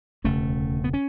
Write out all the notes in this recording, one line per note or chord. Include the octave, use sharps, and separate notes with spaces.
E1 D2 C#3 A3 C#4
B3
C#4